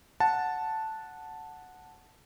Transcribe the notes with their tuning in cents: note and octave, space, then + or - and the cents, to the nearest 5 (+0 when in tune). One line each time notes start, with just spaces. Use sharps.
F#5 -10 A5 +0